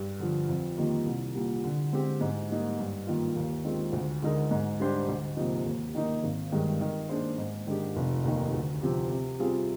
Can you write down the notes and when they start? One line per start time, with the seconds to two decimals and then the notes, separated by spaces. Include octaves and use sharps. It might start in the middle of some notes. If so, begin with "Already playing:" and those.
Already playing: G2
0.19 D3 F3
0.49 F2
0.77 D#3 G3 A#3 F4
1.06 C2
1.35 A#2 G3
1.64 D3
1.92 G#3 C4 G4
2.21 G#2
2.49 G3 A#3 D#4
2.78 G2
3.07 D#3 A#3 F4
3.36 D#2
3.65 D#3 G#3 C4 F4
3.93 D2
4.22 D3 G#3 D#4 A#4
4.51 G#2
4.80 G3 D4 G4 C5
5.08 D2
5.37 C3 F3 A#3 D#4
5.66 D#2
5.95 D#3 A#3 D#4
6.23 G#1
6.52 G2 D#3 G#3
6.81 D#3
7.09 A#3 D4 G#4 C5
7.38 G#2
7.67 D#3 G#3 D4 G4
7.96 F1
8.24 D#2 D#3
8.53 D2
8.82 C3 F3 C4 G4
9.11 C3
9.39 G3 C4 F4 G#4